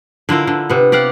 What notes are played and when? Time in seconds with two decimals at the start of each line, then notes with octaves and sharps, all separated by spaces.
0.29 D3 E4 F4 A#4
0.47 D3
0.70 C3 B3
0.92 G4 D5 F5 F#5